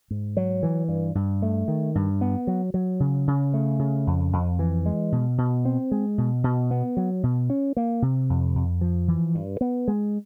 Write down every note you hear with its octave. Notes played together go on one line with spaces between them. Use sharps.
G#2
F#3
E3
G2
G2
A3
D#3
G2
B3
F#3
F#3
C#3
C#3
A3
C#3
F2
F2
E3
G#3
B2
B2
C4
G#3
B2
B2
B3
F#3
B2
C#4
A#3
C3
F2
F2
F3
E3
G2
B3
G#3